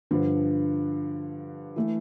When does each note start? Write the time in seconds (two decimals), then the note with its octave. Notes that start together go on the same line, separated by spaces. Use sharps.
0.11 G2 D3 F3
1.76 E3 A3